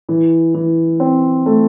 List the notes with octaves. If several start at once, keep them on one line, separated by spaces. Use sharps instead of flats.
E3
E3
C4
A3